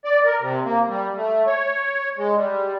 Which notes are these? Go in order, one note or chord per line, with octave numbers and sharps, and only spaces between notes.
D5
A#4
C3
A#3
G3
A3
C#5
G#3
G3